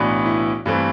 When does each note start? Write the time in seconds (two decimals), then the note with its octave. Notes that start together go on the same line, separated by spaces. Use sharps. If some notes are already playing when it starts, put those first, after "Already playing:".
Already playing: B1 A2 E3 B3 D4
0.26 E4
0.66 G2 E3 A3 C4